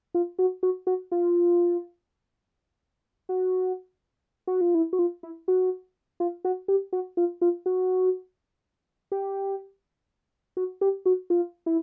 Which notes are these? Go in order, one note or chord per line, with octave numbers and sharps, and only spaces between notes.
F4
F#4
F#4
F#4
F4
F#4
F#4
F4
E4
F#4
F4
E4
F#4
F4
F#4
G4
F#4
F4
F4
F#4
G4
F#4
G4
F#4
F4
E4